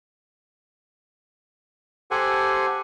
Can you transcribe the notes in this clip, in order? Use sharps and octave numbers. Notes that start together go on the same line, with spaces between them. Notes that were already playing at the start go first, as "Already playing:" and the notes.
G4 A4 C5 F#5 G#5